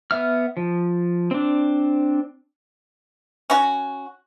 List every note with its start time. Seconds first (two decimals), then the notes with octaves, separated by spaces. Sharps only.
0.11 B3 E5 F6
0.57 F3
1.31 C4 D4
3.50 C#4 F#4